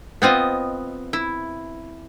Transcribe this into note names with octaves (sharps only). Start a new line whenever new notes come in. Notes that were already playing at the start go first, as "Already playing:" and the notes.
B3 C4 F4 D#5
E4